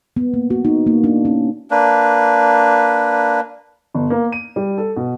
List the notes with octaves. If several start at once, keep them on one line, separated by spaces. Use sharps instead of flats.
B3
A#3
F#4
D#4
A#3
D4
C#4
A#3 D4 B4
G1
A#3
D#7
G3
A4
B2